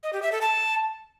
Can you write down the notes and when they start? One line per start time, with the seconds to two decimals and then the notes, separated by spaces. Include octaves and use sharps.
0.03 D#5
0.13 G4
0.22 E5
0.32 A4
0.41 A5